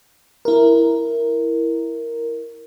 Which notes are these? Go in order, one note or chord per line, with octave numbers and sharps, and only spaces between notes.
E4 A#4